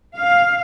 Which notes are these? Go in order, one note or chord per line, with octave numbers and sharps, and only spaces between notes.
F5